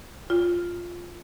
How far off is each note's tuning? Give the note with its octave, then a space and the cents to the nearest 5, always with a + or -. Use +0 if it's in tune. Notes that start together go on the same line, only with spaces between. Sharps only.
F4 +0